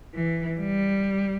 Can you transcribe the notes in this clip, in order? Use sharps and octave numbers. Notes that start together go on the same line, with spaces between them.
E3
G3